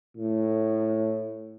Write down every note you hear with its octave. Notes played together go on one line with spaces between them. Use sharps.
A2